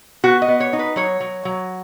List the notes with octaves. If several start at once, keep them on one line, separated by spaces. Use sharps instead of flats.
B3 F#4
D#5
B3
C#5
D#4
B4
F#3 C#5
F#3
F#3